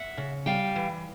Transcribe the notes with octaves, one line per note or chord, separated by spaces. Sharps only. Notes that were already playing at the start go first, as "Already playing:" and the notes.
Already playing: E5 F#5
C#3
G3 F5 G5
E3